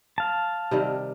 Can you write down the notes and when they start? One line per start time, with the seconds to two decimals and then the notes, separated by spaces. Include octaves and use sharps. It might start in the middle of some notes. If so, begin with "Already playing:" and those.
0.18 F5 A5
0.71 C3 D#3 G3